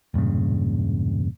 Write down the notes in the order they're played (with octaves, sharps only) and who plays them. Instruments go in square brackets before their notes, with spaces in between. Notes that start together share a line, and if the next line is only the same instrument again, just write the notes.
[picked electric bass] E1 G2 A#2 C#3